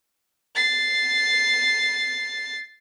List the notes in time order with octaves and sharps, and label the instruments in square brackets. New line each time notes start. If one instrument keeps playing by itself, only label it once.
[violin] A6 C7